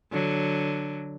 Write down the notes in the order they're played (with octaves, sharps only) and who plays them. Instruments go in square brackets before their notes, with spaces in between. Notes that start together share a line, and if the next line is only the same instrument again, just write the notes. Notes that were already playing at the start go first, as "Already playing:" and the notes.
[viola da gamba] D3 F#3